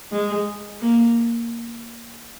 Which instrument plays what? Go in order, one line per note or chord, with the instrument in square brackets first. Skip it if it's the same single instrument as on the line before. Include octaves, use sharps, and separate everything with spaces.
[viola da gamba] G#3
A#3